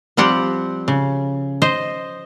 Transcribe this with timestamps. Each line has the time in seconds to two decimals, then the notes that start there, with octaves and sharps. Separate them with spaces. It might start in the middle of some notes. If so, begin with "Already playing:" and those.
0.17 F3 G3 C4 G4 F#5
0.88 C#3
1.62 C5 D#5